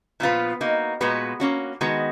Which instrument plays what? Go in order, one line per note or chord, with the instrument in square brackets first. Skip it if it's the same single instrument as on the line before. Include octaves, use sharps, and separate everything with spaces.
[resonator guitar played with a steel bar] A#2 F3 B3 F4 B4
A#3 D#4 F#4
A#2 G#3 B3 F#4 B4
A#3 C#4 F#4
D#3 G#3 B3 F#4